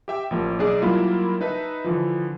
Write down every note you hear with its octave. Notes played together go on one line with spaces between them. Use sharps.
G4 E5 G5
A1 F3 A#3
B1 D4 G#4 D5
F#3 G3 A#3 E4 F4
D#4 B4 E5 A5
D3 E3 F3